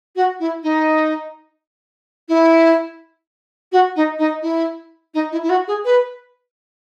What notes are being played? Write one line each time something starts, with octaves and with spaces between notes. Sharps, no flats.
F#4
E4
D#4
E4
F#4
D#4
D#4
E4
D#4
E4
E4
F#4
G#4
B4